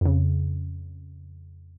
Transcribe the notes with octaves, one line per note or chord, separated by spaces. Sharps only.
F2 C#3